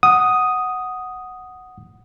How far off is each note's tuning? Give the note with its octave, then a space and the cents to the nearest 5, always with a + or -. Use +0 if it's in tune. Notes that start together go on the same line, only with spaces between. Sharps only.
F#5 +0 D#6 +0